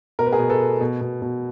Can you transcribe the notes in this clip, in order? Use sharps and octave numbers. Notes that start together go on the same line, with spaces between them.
B2 A#4
B4
G#4 A#4
B2
A4 B4
B2
B2
B2
B2